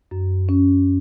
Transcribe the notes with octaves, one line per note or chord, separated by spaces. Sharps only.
F#2
C#4